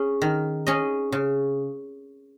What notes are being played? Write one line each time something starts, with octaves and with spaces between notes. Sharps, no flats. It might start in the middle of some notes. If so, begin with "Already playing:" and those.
Already playing: C#4 G#4
D#3
C#4 G#4 D#5
C#3